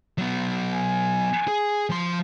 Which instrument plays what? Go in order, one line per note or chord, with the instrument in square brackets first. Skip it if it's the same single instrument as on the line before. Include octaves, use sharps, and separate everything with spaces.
[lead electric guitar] F#3 B3
[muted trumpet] G#5
[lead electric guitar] G#4
F3 C6